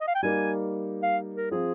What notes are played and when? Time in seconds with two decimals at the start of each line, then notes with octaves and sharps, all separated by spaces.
0.01 D#5
0.08 F5
0.15 G5
0.23 G3 A#3 D#4 G#5
1.03 F5
1.36 A#4
1.51 F3 C4 F4 G#4